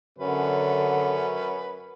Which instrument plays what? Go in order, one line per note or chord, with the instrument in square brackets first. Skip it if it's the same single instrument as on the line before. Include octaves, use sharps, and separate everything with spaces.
[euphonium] F#2 [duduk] D3 [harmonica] C#4 B4